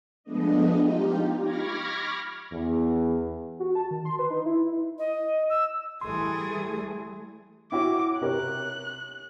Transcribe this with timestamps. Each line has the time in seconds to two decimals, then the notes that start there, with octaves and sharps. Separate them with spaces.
0.23 F3 G#3 A3 B3 D4 D#5
0.76 D#4 F4 G4
1.40 B5 C#6 D6 F6 G#6 A#6
2.52 E2
3.60 F#4
3.75 A5
3.91 D#3
4.05 C6
4.19 B4
4.30 D#4
4.45 E4
4.99 D#5
5.50 E6
6.01 E3 G3 A3 G#4 C6
7.72 E4 F#4 C#5 D6
8.21 C3 A#4 C#5 F#6